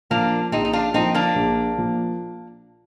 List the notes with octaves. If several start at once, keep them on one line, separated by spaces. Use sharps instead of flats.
A#2 F3 A#3 D4
A#1 C4 D#4
D#4
D4 F4
A#2 F3 C4 D#4
A#3 D4
A#1
A#2 F3